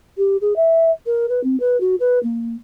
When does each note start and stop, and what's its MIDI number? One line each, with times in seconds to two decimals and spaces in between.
0.17 0.37 67
0.41 0.55 68
0.56 0.90 76
1.06 1.26 70
1.29 1.42 71
1.43 1.58 60
1.59 1.79 71
1.80 1.95 66
2.00 2.19 71
2.23 2.56 58